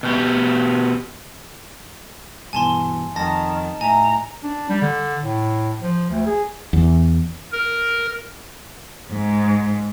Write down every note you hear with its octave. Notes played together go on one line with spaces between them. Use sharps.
B2 G4
G2 B2 E3 G#5 A5 C6
F2 D#3 A5 A#6
A2 E5 G#5 A#5
D4
G3
D3
A2
F3
D2
G#4
E2
A#4
G#2